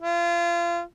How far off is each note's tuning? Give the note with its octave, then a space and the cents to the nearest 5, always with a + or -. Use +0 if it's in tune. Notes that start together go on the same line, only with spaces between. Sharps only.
F4 -30